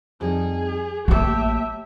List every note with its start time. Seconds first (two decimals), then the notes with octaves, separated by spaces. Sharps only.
0.21 F2 G3 D#4 G#4
1.08 A1 F#3 A3 A#3 G4 C#5 E5 A5